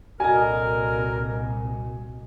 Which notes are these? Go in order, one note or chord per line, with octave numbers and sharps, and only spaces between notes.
C2 A#2 D3 G3 F#4 A#4 D#5 G#5